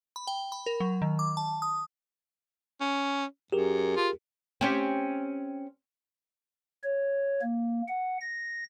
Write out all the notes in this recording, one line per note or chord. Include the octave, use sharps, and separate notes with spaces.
B5
G5
B5
A#4
F#3
D#3
D6
A5
D#6
C#4
F#2 G4 G#4 A#4
F4
C4 C#4 G4
C#5
A#3
F#5
A#6